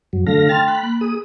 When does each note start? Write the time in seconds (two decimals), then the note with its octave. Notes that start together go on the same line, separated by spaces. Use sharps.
0.13 F#2 F#3
0.27 D3 A3 A4 F5 A#6
0.49 G5 A5 C6 F6 A6
0.68 B5 F#6
0.83 A#3
1.01 G#4 D#6